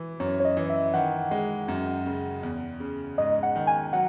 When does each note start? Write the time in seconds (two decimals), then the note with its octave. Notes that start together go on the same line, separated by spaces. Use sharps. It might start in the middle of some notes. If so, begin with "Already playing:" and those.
Already playing: E3
0.20 F#2 C#5
0.40 C#5
0.45 D#5
0.57 E3
0.70 E5
0.94 D#3 F#5
1.31 G#3
1.68 F#2
2.06 C#3
2.43 E2
2.80 C#3
3.18 G#2 D#5
3.43 F#5
3.56 D#3
3.67 G#5
3.93 F#3 F#5